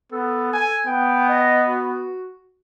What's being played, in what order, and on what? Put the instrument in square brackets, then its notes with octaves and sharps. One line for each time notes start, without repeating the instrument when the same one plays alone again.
[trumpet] B3 [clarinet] A4
[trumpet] G#5
[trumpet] B3 [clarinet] G5
[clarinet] D#5
F#4